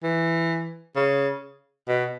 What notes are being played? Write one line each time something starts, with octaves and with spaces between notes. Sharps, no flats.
E3
C#3
B2